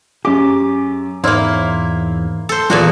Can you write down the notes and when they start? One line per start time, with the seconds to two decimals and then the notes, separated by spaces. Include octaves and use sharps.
0.25 F#2 C#4 G4 G#4 D6
1.24 E2 G#2 A#3 E4 C#5 D5 C6 F6
2.49 A4 C5
2.70 E2 A#2 G3 F4 F#4